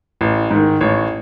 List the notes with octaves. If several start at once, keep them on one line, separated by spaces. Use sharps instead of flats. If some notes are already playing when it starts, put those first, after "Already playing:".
A1
G#2 D#3
A1 C#5